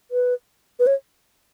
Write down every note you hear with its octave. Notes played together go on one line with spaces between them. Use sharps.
B4
B4
C#5